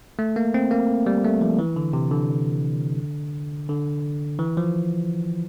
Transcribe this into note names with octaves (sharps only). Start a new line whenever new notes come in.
A3
A#3
C4
A#3
G3
A3
F3
E3
D3
C3
D3
D3
E3
F3